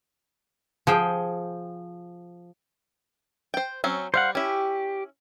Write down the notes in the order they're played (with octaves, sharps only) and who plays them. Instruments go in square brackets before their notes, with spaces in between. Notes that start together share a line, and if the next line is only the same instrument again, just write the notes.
[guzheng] F3 G#4 G5
[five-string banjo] C5 G5
F#3 C4 C#4
[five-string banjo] G3 [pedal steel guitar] C5 F5 F#5
[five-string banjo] C#4 E4 [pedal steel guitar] G4